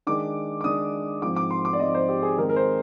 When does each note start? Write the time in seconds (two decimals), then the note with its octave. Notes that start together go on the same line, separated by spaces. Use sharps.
0.07 D#3 G#3 D4 D6
0.61 D6
0.64 D#3 G#3 D4 D#6
1.22 G#2 F3 C4 D6
1.36 D6
1.51 C6
1.65 D6
1.73 D5
1.79 G#2 F3 C4 D#5
1.95 C5
2.09 G4
2.23 G#4
2.38 D#3 G#3 C4 A#4
2.49 A#4
2.56 C5